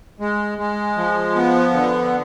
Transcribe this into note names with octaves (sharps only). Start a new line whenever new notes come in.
G#3
G#3
F3
B3
D3